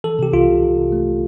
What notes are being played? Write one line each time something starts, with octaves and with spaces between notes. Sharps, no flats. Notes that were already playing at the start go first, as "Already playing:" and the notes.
E3 A4
C3 G4
C2 F4
C3
C3
C3
A3